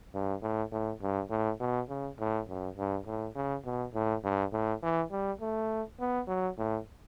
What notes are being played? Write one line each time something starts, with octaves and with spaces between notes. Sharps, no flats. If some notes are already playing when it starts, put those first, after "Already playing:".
G2
A2
A2
G2
A2
B2
C#3
A2
F#2
G2
A2
C#3
B2
A2
G2
A2
E3
G3
A3
B3
F#3
A2